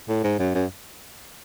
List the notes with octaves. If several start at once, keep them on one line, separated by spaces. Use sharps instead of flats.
A2
G#2
F#2
F#2